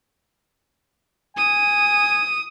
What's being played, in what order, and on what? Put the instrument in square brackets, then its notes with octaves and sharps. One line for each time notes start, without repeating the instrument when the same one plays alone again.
[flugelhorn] G#5 [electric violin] D#6